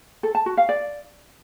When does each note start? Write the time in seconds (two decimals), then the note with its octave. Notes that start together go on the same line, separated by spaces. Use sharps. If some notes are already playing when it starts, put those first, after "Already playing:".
0.23 A4
0.35 A5
0.46 F#4
0.57 F5
0.69 D5